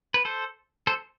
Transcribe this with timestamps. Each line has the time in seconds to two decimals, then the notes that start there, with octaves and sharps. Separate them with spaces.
0.14 B4
0.25 A4 C5
0.87 A4 C5